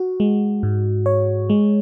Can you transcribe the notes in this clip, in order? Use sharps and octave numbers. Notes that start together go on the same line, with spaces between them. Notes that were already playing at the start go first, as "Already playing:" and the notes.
Already playing: F#4
G#3
G#2
C#5
G#3